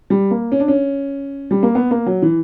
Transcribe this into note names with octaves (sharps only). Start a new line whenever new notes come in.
G3
A#3
C#4
D4
C#4
G3
A#3
B3
A#3
F#3
E3